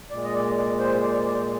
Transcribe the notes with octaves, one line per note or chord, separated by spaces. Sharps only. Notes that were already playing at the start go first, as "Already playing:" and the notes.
A#2 G#3 D5
D#5
D5
D5
C5
D5
D5